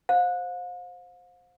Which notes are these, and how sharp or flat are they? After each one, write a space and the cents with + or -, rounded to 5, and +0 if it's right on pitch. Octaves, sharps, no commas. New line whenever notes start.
C5 +0 F5 +40